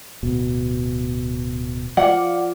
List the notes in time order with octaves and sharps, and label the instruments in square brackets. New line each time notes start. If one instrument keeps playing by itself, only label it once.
[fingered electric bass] D1 B2
[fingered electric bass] F3 [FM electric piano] D5 F5 D6 [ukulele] F#5